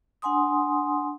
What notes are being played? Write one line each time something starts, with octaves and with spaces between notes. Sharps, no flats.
D4 F#5 G#5 C6 D#6